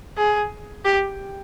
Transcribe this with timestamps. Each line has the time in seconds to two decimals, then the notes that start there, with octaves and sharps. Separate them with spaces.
0.18 G#4
0.85 G4